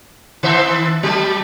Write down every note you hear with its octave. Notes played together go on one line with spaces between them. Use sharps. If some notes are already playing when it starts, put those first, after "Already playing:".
D#3 C5 E5
F#3 A3